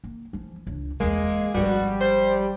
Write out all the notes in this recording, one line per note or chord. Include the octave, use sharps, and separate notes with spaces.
A#3
E3 F3
C#2 D4
F#1 E2 G#3 A#3 G#4
G#1 F3 G3 B3 D4 F#4
C5